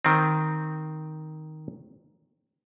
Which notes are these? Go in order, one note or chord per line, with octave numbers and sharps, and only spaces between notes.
D#3 C4